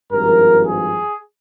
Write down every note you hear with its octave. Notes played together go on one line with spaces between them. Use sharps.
G#1 G2 F3 A#4
G#4